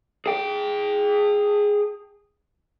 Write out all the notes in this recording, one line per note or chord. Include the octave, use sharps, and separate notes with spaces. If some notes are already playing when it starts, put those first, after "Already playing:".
G#4 G5